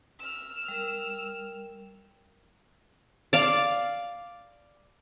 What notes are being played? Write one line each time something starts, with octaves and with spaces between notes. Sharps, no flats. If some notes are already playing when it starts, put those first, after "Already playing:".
E6 F6
G3 A#4
D5 F5